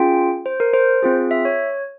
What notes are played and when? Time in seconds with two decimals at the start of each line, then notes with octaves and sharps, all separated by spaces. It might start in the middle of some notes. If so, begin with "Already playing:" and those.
Already playing: C#4 F4 G#4 G5
0.46 C5
0.60 A#4
0.74 C5
1.03 C4 F4 G#4
1.31 E5
1.45 C#5